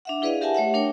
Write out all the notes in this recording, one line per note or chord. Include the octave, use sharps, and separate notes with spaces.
D4 E5 F#5
E4 G#4 B4 D5 D#5 F5
G4 A#4 E5 F#5 G#5 A5
A3 C#5 E5 F#5
D4 A#4 C#5 G5